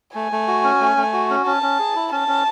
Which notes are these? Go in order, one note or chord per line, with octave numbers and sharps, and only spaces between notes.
A3 G#5
A3
F#4
C#4
A3
A3
F#4
C#4
C#4 A5
C#4
G#4
E4
C#4 A5
C#4